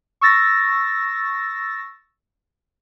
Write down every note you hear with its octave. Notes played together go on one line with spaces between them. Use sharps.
C#6 E6 A6 A#6